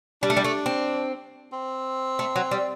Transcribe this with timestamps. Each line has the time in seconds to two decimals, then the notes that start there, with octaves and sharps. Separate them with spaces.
0.23 G3 D4
0.30 A3
0.37 G3
0.44 A3
0.66 C4
1.53 C4
2.19 A3
2.36 F#3
2.51 G3